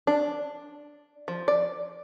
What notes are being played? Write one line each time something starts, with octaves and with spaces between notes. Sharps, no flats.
D4
F3
D5